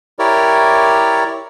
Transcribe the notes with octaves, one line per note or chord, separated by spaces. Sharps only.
E4 G4 A#4 C#5 D5